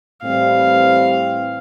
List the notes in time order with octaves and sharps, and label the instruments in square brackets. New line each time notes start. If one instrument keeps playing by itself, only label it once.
[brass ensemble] A2 E3 G3 C4 [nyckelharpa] F5